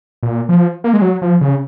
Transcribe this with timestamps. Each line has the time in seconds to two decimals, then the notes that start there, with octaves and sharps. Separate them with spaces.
0.23 A#2
0.49 F3
0.84 A#3
0.93 G#3
1.02 F#3
1.22 F3
1.41 C#3